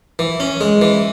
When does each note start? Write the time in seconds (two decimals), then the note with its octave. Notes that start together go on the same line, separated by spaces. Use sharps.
0.19 E3
0.40 C#4
0.61 G#3
0.81 E3